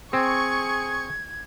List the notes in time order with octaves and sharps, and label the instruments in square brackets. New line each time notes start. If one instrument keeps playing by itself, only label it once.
[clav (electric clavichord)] C4 [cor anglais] G#4 [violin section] C#6 [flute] G#6